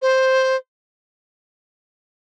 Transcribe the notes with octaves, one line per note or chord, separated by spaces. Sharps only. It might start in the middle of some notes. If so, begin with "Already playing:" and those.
C5